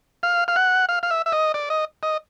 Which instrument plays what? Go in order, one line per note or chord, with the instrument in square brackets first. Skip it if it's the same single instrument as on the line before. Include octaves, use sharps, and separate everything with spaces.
[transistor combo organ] F5
F5
F#5
F5
F5
E5
E5
D#5
D5
D#5
D#5